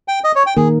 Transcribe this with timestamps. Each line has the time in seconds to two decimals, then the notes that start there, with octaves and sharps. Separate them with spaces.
0.08 G5
0.24 D#5
0.36 C#5
0.46 G5
0.57 D#3 A#3 D#4 G#4 A#4